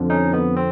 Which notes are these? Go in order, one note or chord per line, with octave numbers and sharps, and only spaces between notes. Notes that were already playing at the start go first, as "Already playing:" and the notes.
Already playing: F2 D3 F3
C#4 D#4
B3
C4